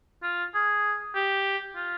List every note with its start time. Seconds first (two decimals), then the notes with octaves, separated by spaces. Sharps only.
0.23 F4
0.55 G#4
1.15 G4
1.76 F4